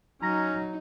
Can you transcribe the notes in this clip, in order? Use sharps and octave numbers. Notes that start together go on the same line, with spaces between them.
F#3 C#4 D#4 A#5 A#6